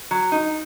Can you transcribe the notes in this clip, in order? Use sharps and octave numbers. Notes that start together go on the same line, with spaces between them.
F#3
D#4